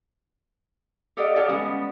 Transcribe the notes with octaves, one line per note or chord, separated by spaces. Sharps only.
G4 A4 D5 D#5 F5 F#5
G4 A4 C#5 D5 F5 A5
G3 G#3 B3 C#4